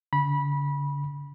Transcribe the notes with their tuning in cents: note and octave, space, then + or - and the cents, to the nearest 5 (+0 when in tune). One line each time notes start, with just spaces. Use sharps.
D3 -45 B5 -20